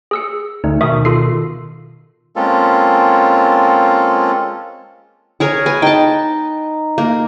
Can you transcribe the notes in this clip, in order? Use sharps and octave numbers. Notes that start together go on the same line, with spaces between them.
G#4 E6 C#7
D2 D#4
B2 D#3 E5 C#6 D#6
F4 A4 C7
G#3 A#3 C4 C#4 F4 A4
G#4 A#4 C#5
B4 G#5
D#4 G5 A5
A#3